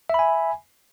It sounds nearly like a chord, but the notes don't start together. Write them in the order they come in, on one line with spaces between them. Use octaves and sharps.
E5 B5 G#5